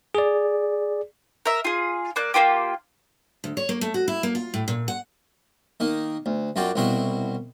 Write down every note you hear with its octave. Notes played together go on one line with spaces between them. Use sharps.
G#4 D5
A#4 E5
F4 G#4
A#3 D5 F#6
A#3 C4 F4 G4
D2
C#5
A#3
A3
F#4
E4
A#3
F4
A2
A#2
F#5
D#3 A#3 D#4
D2
F#2 F4 F#4 D5 G5
C2 B2 C4 E4 F#4 F5